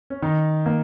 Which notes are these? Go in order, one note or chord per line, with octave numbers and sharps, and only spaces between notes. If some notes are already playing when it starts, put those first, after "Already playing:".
C#4
D#3 D#4
A#3